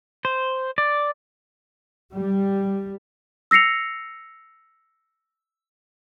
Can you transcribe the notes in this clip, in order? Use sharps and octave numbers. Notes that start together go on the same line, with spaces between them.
C5
D5
G3
E6 A#6 C7 C#7 F7